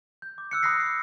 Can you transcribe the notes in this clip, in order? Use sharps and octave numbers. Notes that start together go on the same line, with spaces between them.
G6
D6
E6 F#6 C#7
B5 D#6 F#6 A#6 C7
C#7